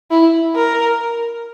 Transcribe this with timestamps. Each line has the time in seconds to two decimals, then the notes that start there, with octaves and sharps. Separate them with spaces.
0.11 E4
0.55 A#4